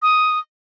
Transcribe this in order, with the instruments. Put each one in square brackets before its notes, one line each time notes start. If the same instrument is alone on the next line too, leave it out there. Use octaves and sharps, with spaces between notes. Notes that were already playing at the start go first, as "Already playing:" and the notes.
[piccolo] D#6